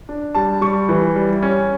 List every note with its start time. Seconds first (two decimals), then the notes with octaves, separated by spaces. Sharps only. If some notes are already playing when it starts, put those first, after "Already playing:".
0.09 D4
0.35 G3 A5
0.61 G3 C#6
0.89 E3
1.16 G3
1.43 C#4